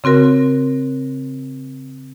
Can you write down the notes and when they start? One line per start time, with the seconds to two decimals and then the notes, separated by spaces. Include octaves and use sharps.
0.04 C#3 C4 F#4 A#4